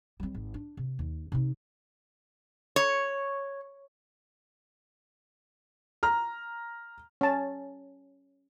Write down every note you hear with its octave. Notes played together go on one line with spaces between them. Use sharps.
G3 C4
G#1
D4
C3
D#2
C3 D#4
C#5
A#5 F6
C#4 A5